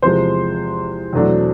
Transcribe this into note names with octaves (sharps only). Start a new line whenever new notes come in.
E2 C3 F3 G#3 C5 C6
E2 B2 F#3 A3 D4